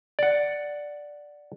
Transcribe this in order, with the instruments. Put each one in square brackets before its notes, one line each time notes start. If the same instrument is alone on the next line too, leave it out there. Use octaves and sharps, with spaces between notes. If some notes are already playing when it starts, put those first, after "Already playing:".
[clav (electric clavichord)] D5 F#5